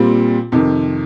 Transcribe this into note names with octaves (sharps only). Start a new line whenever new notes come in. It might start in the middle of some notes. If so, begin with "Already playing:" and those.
Already playing: A#2 G3 C4 F4
F2 C3 D#3